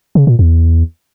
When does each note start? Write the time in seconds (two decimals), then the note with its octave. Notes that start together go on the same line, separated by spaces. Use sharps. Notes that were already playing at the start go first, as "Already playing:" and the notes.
0.15 C#3
0.27 A#2
0.39 E2